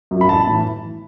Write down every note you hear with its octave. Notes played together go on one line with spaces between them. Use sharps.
F#2 F#3
B5
A1 A5
A2 E3